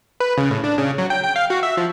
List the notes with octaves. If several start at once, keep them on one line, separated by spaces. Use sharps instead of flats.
B4
C#3
A2
D4
C#3
F#3
G5
G5
F5
F#4
E5
F3